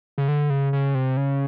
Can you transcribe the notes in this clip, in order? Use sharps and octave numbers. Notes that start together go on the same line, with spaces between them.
C#3
D3
C#3
C#3
C3
C#3